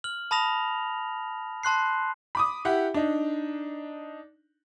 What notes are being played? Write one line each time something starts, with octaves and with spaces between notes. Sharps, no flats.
F6 F#7
A5 B5 D#6 A#6 F7
A5 C6 F#6 C7
B5 D6 D#6
E4 G4 F#5
D4 D#4